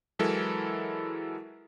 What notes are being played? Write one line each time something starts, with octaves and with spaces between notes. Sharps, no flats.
E3 F#3 G#3 E4 A4 A#4